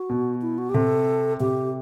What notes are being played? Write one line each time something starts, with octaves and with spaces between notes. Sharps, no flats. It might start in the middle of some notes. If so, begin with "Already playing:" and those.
Already playing: F#4
B2
E4
F#4
G4
C3 A4
C3 G4